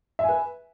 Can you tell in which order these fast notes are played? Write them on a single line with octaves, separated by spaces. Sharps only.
E5 G#5 B4